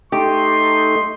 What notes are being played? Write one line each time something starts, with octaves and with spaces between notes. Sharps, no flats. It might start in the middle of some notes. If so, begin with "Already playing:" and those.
A3 D#4 G4 C6